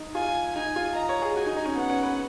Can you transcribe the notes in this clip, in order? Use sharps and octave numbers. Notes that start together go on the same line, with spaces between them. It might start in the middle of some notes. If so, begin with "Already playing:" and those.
Already playing: D#4
F4 G#5
D#4 G#5
F4
D#5 A#5
C#5
G#4
F#4 G#5
D#4
D#4
C#4
B3 F#5
C#4
B4